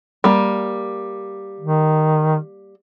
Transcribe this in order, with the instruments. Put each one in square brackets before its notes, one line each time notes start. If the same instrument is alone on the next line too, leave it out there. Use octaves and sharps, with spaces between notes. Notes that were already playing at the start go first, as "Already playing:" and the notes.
[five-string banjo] G3 A#3
[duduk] D#3